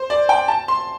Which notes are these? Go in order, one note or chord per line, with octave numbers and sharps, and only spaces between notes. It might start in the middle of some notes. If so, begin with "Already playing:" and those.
Already playing: C5
D5
G5
A5
C6